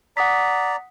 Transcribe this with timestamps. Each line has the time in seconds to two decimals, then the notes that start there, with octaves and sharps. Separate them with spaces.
0.17 D5 F#5 A#5 D#6 B6